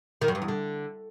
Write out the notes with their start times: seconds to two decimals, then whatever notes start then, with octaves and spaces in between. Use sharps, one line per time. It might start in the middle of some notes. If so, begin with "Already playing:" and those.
0.22 D#3
0.28 F#2
0.35 G2
0.42 E2
0.48 D3